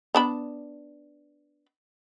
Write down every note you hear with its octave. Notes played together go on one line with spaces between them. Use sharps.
B3 D4 B5